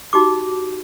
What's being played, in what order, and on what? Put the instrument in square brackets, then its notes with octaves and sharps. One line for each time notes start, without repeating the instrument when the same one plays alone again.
[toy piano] D#4 F#4 G4 D6